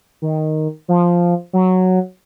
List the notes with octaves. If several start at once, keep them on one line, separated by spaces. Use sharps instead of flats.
D#3
F3
F#3